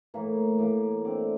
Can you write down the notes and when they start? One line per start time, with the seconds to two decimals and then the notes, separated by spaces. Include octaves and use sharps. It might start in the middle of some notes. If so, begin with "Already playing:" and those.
0.14 A2 E3 A#3
0.59 A2 E3 A#3 D6
1.04 D3 A3 C4 D6